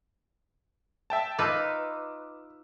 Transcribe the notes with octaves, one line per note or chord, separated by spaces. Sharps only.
E5 G5 A5
D#4 F4 B4 D6 E6